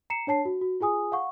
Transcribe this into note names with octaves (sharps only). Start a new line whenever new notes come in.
A#5 C7 C#7 E7
D4 C#5 A5 C7
F#4
F#4
F4 G#4 G#5 D#6
F5 F#5 C#6